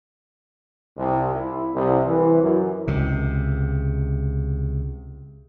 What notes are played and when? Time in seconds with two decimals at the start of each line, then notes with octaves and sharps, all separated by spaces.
0.97 C2
1.34 E4
1.75 C2
2.06 E3
2.42 F#2
2.87 C#2 C3